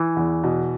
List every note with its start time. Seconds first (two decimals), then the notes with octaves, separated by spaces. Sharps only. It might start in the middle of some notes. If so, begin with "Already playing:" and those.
Already playing: E3
0.17 E2
0.43 B2